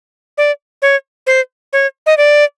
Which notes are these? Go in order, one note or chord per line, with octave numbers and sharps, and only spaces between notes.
D5
C#5
C5
C#5
D#5
D5